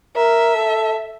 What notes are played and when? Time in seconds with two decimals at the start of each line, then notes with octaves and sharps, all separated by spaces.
0.16 A#4 E5
0.55 A4